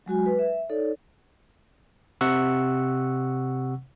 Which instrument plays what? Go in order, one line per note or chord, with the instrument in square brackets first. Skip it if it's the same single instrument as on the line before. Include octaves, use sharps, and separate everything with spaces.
[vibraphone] F#3 G#3 F#4 G#5
B4
E5
D#4 A4 C#5 D5
[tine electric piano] C3 F#5 C#6 E6